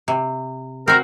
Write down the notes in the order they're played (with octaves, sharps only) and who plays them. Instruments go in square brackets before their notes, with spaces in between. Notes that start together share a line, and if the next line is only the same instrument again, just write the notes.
[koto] C3
[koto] C4 F#4 [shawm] A#4